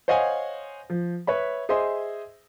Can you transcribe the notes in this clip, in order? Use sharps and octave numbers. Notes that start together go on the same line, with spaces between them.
C5 C#5 D#5 F5 F#5 G#5
F3
B4 C#5 E5 B5
G#4 C5 D#5 E5 C6